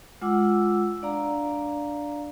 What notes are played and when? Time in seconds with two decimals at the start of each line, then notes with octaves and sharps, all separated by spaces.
0.21 G#3 F4 F#5 D6 E6
1.02 D4 D5 F5 A#5